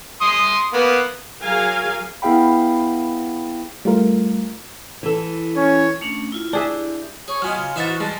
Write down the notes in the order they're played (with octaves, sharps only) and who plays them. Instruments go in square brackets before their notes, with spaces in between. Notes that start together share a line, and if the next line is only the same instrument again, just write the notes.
[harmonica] C6 D#6
A#3 B3
[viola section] F#3 G#4 A#4 F5 G#5
[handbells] B3 E4 G#4 F5 G5 B5
[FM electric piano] G3 A3 F4 A#4
[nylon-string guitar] E3 A4
[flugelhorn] C#4 [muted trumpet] C#5
[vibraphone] A3 C#4 D4
E4 F4
[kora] D4 G#4 E5 [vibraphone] E4 G4
[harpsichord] G#4 [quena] C#5
[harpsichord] F#3 B3 D#5 [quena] F4 [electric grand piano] G#5 F6
[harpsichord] C#3
[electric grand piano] E3 A6 [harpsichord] D#4 C5 E5 [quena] F#5
[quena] F#4
[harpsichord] G3 [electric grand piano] G#3 [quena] A5